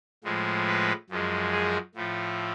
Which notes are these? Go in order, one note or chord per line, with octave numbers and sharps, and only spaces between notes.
A2 F3 G#3
B4
F#2 F3 G#3
G#4
A2 F3 A3